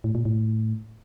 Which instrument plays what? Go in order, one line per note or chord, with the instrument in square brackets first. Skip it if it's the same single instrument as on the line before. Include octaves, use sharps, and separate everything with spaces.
[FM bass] A2
A#2
A2